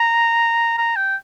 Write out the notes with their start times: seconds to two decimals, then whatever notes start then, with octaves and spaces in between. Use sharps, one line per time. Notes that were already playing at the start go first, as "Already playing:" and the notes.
Already playing: A#5
0.78 A#5
0.96 G5